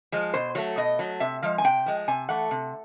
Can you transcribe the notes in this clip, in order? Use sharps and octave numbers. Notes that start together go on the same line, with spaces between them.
F3 G#3
B2 C5
F#3 A3 C#5
B2 D#5
F#3 A3
C3 E5
F3 G#3 F5
G#5
C3 G5
F3 G#3
C3 G#5
E3 A3 F#5
C3